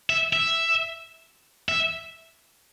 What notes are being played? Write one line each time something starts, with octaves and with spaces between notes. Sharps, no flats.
E5
E5
E5